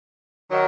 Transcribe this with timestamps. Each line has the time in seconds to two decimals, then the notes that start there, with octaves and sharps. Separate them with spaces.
0.50 D#3 F#3